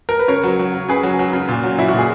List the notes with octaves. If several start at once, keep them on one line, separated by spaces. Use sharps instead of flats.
A#4
B4
C#3 A#4 C#5
F#3
F#3
C#3
C#3 G#4 B4
F#3
F#3
C#3
A#2
F#3
F#3 E4
F#4
A#2 G#4